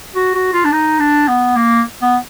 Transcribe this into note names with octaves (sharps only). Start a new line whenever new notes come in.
F#4
F#4
F4
D4
D#4
D4
B3
A#3
B3